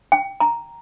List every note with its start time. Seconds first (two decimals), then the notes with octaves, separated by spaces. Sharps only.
0.12 G5
0.40 A#5